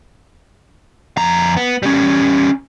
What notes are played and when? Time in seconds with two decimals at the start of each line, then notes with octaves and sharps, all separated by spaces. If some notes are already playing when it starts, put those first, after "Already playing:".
1.17 F2 A#5
1.57 B3
1.83 G3 C#4